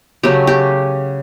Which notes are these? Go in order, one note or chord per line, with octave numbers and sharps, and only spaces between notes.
C#3 F#3 A3 G4
G4